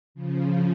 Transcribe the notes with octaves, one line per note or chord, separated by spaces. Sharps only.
C#3 F3